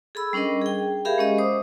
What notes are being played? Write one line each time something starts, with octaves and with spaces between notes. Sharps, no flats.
G#4 A4 B5 E6
G3 C#4 D4 A#4 D#5
G#4 G5
G4 G#4 A#4 E5 F5 B5
G#3 C#4 D#5
C5 D6 D#6